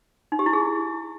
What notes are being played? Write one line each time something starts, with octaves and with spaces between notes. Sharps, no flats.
D#4
G4
E4
G#4